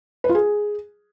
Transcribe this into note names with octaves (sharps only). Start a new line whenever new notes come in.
B4
F4
G#4